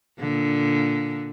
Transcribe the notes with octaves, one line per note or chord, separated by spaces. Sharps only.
A#2 D3